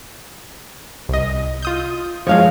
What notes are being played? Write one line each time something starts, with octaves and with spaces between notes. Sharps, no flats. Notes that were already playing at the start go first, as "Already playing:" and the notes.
C2 D#5
F4 D#6 G6
F3 F#3 G#3 C#5 F5